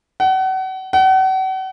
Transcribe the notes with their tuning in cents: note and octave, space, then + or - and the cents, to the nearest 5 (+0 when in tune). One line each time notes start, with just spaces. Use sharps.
F#5 +35
F#5 +40